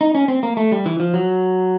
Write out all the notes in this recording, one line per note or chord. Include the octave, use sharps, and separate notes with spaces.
D#4
C#4
C4
A#3
A3
G3
E3
F3
F#3